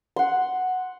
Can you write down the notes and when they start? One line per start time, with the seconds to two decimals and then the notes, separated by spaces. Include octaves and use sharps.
0.16 F#5 C6